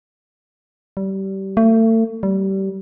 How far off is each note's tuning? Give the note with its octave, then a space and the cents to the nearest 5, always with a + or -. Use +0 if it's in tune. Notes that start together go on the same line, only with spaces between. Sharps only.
G3 -25
A3 +35
G3 -25